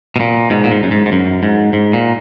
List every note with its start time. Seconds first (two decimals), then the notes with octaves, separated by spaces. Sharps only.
0.16 B2
0.20 A#2
0.50 G#2 B2
0.64 A#2
0.71 G#2
0.83 F#2
0.91 G#2
1.06 G#2
1.12 F#2
1.43 G#2
1.73 G#2
1.93 A#2